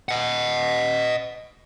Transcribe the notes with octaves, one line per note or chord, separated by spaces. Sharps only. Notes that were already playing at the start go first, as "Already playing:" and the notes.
D#5 F#5